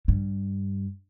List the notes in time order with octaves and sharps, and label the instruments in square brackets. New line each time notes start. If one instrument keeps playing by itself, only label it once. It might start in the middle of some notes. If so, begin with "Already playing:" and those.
[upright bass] G2